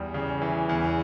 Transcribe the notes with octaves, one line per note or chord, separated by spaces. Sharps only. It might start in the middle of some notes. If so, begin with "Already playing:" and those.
Already playing: E2 G3
C#3
E3
E2